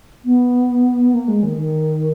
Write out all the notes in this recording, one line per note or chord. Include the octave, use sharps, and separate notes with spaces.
B3
A#3
G#3
D#3
D#3